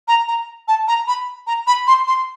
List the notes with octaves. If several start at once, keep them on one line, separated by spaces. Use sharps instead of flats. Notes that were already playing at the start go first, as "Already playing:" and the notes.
A#5
A#5
A5
A#5
B5
A#5
B5
C6
C6